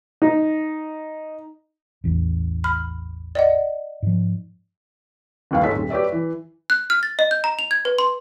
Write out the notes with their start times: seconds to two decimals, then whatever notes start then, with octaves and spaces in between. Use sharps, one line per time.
0.22 D#4
2.04 A1 E2
2.64 B5 F6
3.35 D5 D#5 F#5
4.02 G#2 F3
5.51 G1 D#2 F5
5.63 G#2 G#3 A4 C#5 B6
5.75 D#1
5.90 G4 B4 C#5 D5 E5
6.12 E3
6.70 F#6
6.90 F6
7.03 A6
7.19 D#5
7.31 G6
7.44 A#5
7.59 F7
7.71 G#6
7.85 B4
7.99 C6